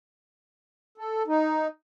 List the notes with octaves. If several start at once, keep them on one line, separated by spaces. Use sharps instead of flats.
A4
D#4